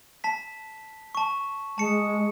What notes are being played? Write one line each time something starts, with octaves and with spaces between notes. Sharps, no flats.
A5 B6
A5 C#6
G#3 A5 C#7